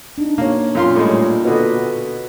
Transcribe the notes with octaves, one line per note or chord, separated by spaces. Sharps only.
D4 D#4
B2 A#3 C#5
F#2 A#2 F4 C6
A2 G3 G#3
B2 D3 F#4 B4 D#5